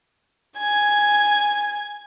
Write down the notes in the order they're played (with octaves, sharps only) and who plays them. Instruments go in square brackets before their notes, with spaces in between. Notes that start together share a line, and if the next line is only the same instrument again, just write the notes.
[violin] G#5 G#6